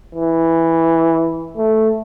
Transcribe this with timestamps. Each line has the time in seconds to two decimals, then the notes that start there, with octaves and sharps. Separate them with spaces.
0.15 E3
1.57 A3